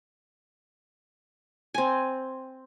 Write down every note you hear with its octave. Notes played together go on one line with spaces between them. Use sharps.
C4 G#5